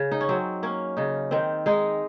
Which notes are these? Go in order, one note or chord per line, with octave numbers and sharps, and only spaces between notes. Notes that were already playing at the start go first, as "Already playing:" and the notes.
Already playing: C#3
D#4
C#4
F#3 C4
A#3 C#4
C#3 D#4
D#3 C4
G#3 D#4